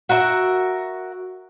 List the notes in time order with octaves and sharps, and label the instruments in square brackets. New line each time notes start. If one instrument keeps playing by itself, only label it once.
[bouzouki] F#4 A#4 D#5 E5